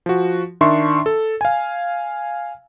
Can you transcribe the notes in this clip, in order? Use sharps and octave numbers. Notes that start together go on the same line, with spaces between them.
F3 F#4
D#3 D4 E5 C6 C#6
A4
F5 G#5